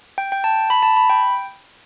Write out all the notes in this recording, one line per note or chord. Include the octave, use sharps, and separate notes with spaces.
G5
G5
A5
B5
A5
B5
G5